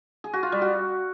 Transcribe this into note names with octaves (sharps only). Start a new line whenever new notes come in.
G#4
F#4
F4
G3
F#4